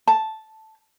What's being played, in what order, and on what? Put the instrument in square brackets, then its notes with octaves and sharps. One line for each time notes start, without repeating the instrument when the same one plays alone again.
[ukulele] A5